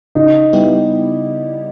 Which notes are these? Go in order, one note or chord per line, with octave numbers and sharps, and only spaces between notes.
C#3 D#4
G3 B3 E4 G4